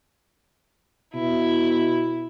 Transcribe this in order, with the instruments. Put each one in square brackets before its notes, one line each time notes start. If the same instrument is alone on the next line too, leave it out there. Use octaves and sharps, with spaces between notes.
[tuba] B2 [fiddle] E4